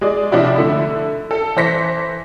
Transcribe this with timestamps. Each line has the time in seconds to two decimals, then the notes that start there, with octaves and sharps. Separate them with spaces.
0.01 G#3 G#4 D5
0.31 C3 F3 D4 E4 F#4
0.56 D3 A3 E4
1.31 A4
1.56 E3 C5 A#6 B6 C#7